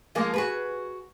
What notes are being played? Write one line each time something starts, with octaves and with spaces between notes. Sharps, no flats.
F3 G#3 A#3
F#4 G#4 B4